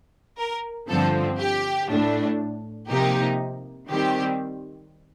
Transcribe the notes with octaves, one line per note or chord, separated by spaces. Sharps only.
A#4
G2 D3 F3 C4 A4
G4
A2 A3 D4
C3 F3 A#3 D#4 G4
D#3 G3 C4 G4